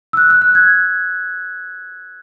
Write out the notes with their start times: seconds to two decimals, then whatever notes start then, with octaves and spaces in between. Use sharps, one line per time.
0.13 E6
0.17 F#6
0.30 F#6
0.42 F#6
0.55 G#6